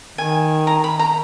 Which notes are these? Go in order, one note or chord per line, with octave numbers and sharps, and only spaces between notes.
D#3 G#5
A#5
B5
A#5